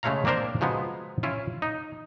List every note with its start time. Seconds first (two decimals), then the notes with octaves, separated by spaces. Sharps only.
0.03 C#3 G#3 A3 C#5 F5 A#5
0.25 A#3 C4 D4 A#4 C5
0.61 C#3 F3 F#3 G#3 B3
1.23 C#4 E4 F4
1.62 D#4